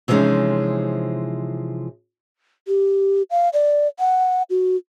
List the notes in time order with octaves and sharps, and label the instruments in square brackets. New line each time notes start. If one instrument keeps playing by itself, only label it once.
[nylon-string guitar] C3 E3 F3 G#3 C#4 D#4
[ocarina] G4
F5
D5
F#5
F#4